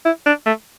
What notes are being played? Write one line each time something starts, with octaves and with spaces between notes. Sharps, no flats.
E4
D4
A3